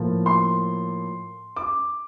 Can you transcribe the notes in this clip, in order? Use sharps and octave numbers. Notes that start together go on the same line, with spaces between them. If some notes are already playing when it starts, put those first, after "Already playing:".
Already playing: A2 F3 A#3
C6
D6